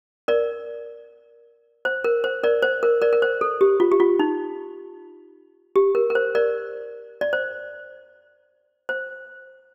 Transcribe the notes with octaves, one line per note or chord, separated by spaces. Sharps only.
A#4 D5
C5
A#4
C5
A#4 D5
C5
A#4
A#4 D5
A#4
C5
A4
G4
F4
G4
F4
D#4
G4
A#4
A#4
C5
A#4 D5
D5
C5
C5